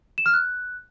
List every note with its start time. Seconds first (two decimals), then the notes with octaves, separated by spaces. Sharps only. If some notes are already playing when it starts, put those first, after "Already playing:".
0.18 E7
0.26 F6
0.34 F#6